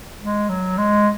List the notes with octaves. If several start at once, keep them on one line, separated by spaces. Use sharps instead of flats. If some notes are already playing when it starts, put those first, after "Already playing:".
G#3
F#3
G#3